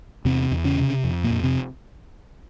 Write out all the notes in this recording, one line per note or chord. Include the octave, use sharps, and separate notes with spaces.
E2 C3 C4
E2
C#3 C#4
C3
F2
A#2 A#3
F2
C3 C4